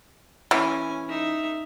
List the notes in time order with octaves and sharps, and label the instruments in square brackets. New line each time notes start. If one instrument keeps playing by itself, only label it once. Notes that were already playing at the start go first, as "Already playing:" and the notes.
[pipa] E3 [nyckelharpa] C#4 G#5
[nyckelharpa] D#4 E5